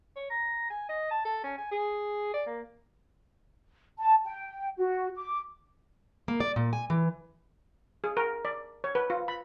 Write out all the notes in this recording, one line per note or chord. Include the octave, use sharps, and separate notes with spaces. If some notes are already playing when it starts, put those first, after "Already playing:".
C#5
A#5
G#5
D#5
A5
A4
C#4
G#5
G#4
D5
A#3
A5
G5
F#4
D6
A#3
D5
A#2
G#5
E3
G#4
A#4
D5
C#5
B4
F4
B5